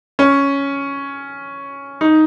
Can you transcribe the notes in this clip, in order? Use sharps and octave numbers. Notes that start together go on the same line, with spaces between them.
C#4
D#4